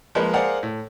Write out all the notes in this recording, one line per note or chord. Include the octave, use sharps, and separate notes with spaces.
F3 G#3 A#3 B4
G#4 A#4 C5 D5 F5 F#5
A2